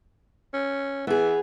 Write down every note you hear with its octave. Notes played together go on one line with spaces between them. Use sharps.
C#4
E3 B3 G#4